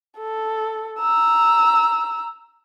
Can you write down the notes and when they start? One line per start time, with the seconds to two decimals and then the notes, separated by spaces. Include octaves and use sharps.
0.18 A4
1.01 A#5 E6